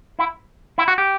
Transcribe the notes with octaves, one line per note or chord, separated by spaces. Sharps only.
E4
E4
F#4
G4